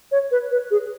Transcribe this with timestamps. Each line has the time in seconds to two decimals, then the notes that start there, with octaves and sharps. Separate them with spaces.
0.12 C#5
0.31 B4
0.51 B4
0.71 G#4